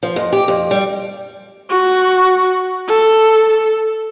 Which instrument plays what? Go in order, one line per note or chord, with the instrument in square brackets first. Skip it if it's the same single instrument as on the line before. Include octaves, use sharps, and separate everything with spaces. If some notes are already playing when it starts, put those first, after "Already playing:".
[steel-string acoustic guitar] F3
F2
G4
F2
G3
[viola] F#4
A4